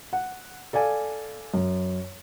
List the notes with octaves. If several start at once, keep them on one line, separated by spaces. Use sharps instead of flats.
F#5
A4 D5 F5 G#5
F#2